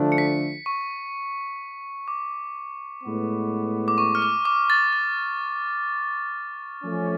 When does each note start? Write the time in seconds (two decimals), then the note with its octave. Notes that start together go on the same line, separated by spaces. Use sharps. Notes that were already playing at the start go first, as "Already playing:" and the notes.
Already playing: D3 F3 A3 D4
0.12 C#7
0.18 B6
0.66 C#6
2.08 D6
3.03 A2 G#3 B3
3.88 D6
3.98 C#6
4.15 F6
4.22 D6
4.45 D6
4.70 A6
4.93 A6
6.83 F3 A3 C#4